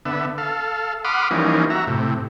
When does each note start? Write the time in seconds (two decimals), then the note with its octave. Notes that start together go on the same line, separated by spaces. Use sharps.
0.05 D3 B3 E5
0.38 A4 F5
1.05 F#5 B5 C6 D6 D#6 F6
1.31 E3 F3 G3 A#3 C#4 D#4
1.70 F#4 E5 A#5
1.87 A2 C3